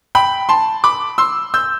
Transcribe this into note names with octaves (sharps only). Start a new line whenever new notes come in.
G5 B5
A5 C6
B5 D6
C6 E6
E6 G6